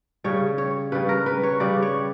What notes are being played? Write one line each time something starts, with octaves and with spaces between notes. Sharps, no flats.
C#3 G3 C#5
C#5
C#3 G3 B4
A#4
B4
C#5
C#3 G3 D5
C#5